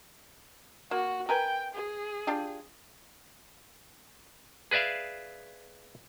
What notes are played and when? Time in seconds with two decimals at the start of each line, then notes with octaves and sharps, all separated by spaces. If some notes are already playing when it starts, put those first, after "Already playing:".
0.91 A#3 F#4
1.29 A#4 B4 G5 G#5
1.75 G#4
2.27 D4 F4 G4
4.71 G#4 B4 D5 E5 F5